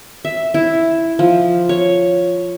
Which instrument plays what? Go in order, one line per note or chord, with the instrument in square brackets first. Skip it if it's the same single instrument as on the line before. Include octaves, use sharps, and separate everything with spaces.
[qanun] E5
E4
F3
C#5